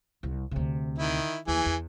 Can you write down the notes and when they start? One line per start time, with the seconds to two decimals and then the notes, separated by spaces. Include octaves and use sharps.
0.23 C2
0.51 D2 C3
0.98 D#3 E4
1.48 D#2 E3 G#4
1.66 E2